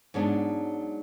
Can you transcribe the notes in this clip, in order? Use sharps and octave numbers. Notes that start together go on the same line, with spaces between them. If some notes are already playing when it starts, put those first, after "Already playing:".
G#2 F#3 B3 D4